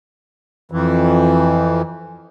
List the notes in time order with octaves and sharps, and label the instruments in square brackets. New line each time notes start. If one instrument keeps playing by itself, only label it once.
[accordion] F2 E3